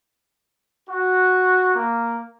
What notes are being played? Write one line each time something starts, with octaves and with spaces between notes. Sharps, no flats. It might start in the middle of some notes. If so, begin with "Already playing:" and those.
F#4
A#3